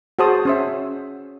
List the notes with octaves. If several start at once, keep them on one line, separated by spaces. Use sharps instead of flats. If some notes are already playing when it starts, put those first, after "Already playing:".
F#4 G#4 C5 A5 D#6
C#4 C5 E5